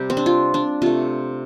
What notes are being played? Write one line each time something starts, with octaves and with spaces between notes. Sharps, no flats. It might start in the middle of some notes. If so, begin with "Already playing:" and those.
Already playing: C3 G3 G4
C4
D4
F4
D4
C3 A3 F4